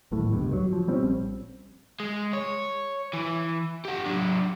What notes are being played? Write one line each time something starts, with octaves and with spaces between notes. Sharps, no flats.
D1 G#1 A2 A3
C#2 G2 B2
F#3
F3
B2 G3 C4 C#4
A#1
G#3
C#5
E3
G4 F#5
F#3 D4